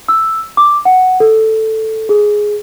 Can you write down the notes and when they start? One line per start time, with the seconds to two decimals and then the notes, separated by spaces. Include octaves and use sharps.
0.08 E6
0.57 D6
0.85 F#5
1.20 A4
2.09 G#4